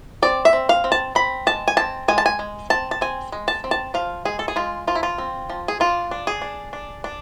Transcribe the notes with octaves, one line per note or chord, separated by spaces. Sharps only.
C4 D5
E5
C4
F5
C4
A5
C4 B5
G#3 A5
G#5
C4 A5
G#3 G#5
A5
G#5
G#3
C4 A5
A5
C4 G#5
G#3
A5
C4
A5
F3 F5
G#3 G#4
A4
G#4
G#3 F4
F3 F4
E4
F4
C4
F3
G#4
D4 F4
D4
G#4
D4
D4
D4